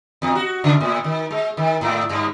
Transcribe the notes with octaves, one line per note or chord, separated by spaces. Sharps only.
E2
F#4
C#3
A2
D#3
G#3
D#3
G#2
G2